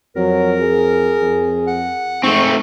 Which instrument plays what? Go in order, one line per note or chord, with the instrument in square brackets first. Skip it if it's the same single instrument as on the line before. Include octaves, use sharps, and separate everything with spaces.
[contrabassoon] F2 [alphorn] F#3 [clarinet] A#4
[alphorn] G#4
[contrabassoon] F2
[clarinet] F#5
[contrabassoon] G#2 [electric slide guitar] A3 C4 [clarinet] C#6